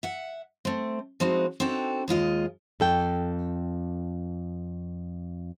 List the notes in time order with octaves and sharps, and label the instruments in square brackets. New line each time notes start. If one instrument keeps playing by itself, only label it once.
[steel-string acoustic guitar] E5 F#5
A3 C4
F3 G#3 C4 D#4 E4 F#4
C4 D4 D#4 F#4 A4 G5
D#2 G#3 F4 D#5
[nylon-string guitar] F2 A4 G5